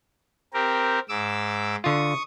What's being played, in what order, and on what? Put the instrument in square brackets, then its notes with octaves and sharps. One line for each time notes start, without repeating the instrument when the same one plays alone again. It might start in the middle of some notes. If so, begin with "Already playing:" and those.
[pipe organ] C4 G4 A#4
G#2 D6 E6
[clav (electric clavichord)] D3 F4 [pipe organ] C#6 D#6